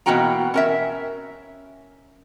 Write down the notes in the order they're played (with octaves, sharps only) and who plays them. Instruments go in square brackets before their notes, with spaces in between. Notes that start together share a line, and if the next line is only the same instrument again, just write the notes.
[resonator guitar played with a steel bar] B2 E3 A#3 F#4 G5 A#5
C#4 A#4 E5